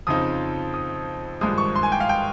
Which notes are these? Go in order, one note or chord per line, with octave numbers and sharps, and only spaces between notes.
F2 C#3 F3 C4 D#4 D#6
D#6
G#1 G2 F3 G#3 D#6
C#6
C6
G#5
G5
F5
G5